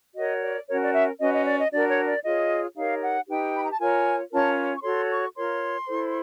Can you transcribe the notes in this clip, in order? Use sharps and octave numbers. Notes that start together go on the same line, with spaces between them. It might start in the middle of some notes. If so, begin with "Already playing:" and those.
F#4 A#4 C#5 D#5
D5
C#4 F#4 A#4 C#5
D5
E5
C#4 F#4 B4 D#5
D#5
D5
D#5
D4 F#4 A#4 D5
C#5
D5
F4 G#4 C#5 D#5
D#4 G4 A#4 C#5 F5
F#5
D#4 G4 B4 G5
B5
A#5
A5
F4 A#4 C#5 G#5
C#4 F4 A#4 C#5 A5
C#6
F#4 A4 C#5 C6
C#6
F4 A#4 C#5 C6
E4 A4 C5